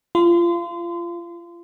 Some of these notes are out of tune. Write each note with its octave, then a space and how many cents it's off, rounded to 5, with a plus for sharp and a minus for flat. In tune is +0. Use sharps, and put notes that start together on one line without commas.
F4 -25 C6 -30